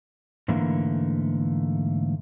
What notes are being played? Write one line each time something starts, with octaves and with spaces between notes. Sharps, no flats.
G#2 D3 E3 A3 A#3